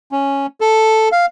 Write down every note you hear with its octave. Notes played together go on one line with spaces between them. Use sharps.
C#4
A4
F5